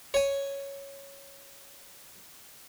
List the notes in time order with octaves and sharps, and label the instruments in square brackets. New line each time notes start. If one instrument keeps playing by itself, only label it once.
[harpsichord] C#5 G#5